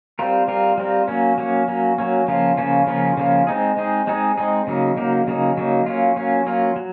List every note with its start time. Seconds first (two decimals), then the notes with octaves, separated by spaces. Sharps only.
0.19 G3 C4 F4 A#4
0.48 G3 C4 F4 A#4
0.78 G3 C4 F4 A#4
1.08 F#3 A#3 C#4
1.38 F#3 A#3 C#4
1.68 F#3 A#3 C#4
1.98 F#3 A#3 C#4
2.28 C#3 F3 A#3 C#4 F4
2.57 C#3 F3 A#3 C#4 F4
2.87 C#3 F3 A#3 C#4 F4
3.17 C#3 F3 A#3 C#4 F4
3.47 G#3 C4 D#4 G#4
3.77 G#3 C4 D#4 G#4
4.07 G#3 C4 D#4 G#4
4.37 G#3 C4 D#4 G#4
4.67 C#3 F#3 A#3 D#4
4.97 C#3 F#3 A#3 D#4
5.27 C#3 F#3 A#3 D#4
5.57 C#3 F#3 A#3 D#4
5.86 F#3 A#3 C#4 F4
6.16 F#3 A#3 C#4 F4
6.46 F#3 A#3 C#4 F4
6.76 F#3